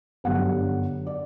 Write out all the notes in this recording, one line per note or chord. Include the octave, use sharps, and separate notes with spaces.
G1 F#2 D3 G3 F#5
D5